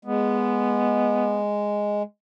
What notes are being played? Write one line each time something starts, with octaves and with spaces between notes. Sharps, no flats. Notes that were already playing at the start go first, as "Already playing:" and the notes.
G#3 B3